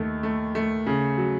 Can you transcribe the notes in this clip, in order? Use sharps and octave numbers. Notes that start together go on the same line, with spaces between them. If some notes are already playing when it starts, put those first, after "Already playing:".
Already playing: D#2 D#3 A3
A3
A3
C#3
F#3